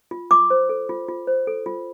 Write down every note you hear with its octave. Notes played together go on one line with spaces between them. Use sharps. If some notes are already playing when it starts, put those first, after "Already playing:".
F4
F4 D6
C5
A4
F4
F4
C5
A4
F4